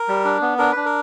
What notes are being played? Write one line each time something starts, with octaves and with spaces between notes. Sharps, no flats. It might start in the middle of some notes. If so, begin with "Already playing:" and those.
Already playing: A#4
G3
D4
B3
D4 A#4
D4 B4
A#4